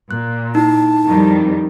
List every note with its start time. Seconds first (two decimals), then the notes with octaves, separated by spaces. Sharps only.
0.11 A#2 F#6
0.55 D#4 E4 A5
1.04 F2 D#3 G3